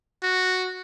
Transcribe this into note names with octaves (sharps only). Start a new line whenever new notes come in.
F#4